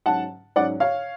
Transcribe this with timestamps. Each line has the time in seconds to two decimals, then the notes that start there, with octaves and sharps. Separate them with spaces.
0.06 G#2 F#3 C#4 F#5 A5
0.56 G#2 F#3 C#4 D5 F#5
0.80 C#5 F5